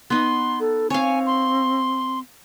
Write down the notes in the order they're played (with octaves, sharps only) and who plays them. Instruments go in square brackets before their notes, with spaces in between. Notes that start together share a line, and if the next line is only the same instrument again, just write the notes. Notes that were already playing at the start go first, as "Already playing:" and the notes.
[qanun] B3 D#4 [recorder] C6
[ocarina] A4
[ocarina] C4 [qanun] C#5 F5 [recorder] G#5
[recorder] C6